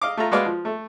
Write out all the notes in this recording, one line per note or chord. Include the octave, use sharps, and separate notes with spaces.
D#5 F5 D6
A3 F4 A#5
G#3 F#4 B4 D5 F5
F3
A3